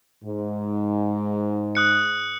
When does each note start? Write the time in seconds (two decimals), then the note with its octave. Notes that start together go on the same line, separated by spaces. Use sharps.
0.24 G#2
1.75 D#6 F#6 C#7